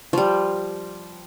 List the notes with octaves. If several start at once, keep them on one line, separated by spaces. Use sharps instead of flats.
F3 G3